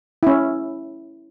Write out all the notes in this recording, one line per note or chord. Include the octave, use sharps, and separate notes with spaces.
C#4 E4